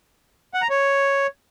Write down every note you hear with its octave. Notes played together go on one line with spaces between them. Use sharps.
F#5
A#5
C#5